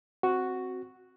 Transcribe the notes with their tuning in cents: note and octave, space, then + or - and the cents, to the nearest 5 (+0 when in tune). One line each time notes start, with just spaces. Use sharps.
C4 +0 F#4 +0